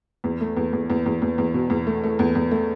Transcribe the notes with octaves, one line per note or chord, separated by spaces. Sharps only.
E2
A3
E2
E2
E2
E2
E2
E2
B2
E2
A3
A3
E2
E2
A3